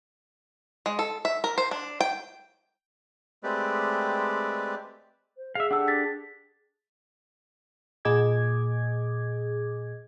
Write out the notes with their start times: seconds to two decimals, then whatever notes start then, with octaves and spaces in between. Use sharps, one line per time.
0.86 G#3
0.99 A4
1.25 E5
1.44 A#4
1.58 C5
1.71 D4
2.00 G5
3.43 G#3 A3 C4 G4 B4 D5
5.37 C5
5.55 G#4 E5 F5
5.71 D4 G4 A4 F#5 E6
5.88 A6 B6
8.05 A#2 G#4 D#5 D6 G#6